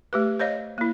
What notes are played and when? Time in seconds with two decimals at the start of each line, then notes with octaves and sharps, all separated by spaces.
0.13 A3 G4 B4
0.39 C5 C#5 D#5 F5
0.78 A#3 E4